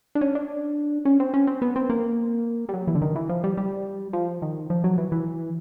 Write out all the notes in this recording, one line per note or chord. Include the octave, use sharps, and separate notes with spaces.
D4
C#4
D4
C#4
C4
C#4
C4
B3
C4
A#3
G3
F#3
E3
D3
D#3
E3
F3
G3
G3
F3
D#3
F3
F#3
E3
E3